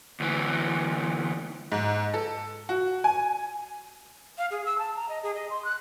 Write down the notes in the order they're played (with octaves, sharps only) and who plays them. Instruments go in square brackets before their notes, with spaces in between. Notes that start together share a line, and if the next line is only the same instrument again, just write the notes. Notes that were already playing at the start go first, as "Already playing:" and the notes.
[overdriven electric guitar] D2 E3
[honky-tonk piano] G#2
A4
F#4
G#5
[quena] F5
G#4
E6
A5
A#5
D#5
G#4
D#5
C6
F#6